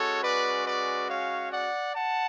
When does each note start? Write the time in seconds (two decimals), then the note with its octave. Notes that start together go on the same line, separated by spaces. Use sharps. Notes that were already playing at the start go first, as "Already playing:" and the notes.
Already playing: G#3 C#4 F#4 A4 C#5
0.23 B4 D5
0.66 B4 D5
1.09 C#5 F5
1.53 D5 F#5
1.96 F#5 A5